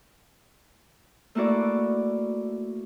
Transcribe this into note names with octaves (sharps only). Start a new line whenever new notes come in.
A3 A#3 E4 F#4 D5